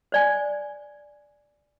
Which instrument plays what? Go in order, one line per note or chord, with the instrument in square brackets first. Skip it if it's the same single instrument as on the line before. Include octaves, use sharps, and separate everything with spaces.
[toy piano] C5 D5 G#5